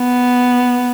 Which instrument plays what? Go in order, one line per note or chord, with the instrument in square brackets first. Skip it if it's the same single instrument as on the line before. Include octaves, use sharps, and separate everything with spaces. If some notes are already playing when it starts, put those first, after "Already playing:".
Already playing: [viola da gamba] B3